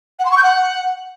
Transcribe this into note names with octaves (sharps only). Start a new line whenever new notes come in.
F#5
C6
C#6
G6
F#5